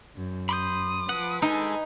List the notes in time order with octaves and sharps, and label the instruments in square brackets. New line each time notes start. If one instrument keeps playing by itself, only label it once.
[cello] F#2
[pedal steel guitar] B5 C6 G6 [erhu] D#6
[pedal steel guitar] F3 F#5 [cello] B4
[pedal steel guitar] G#3 A4 [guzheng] D#4 [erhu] G#5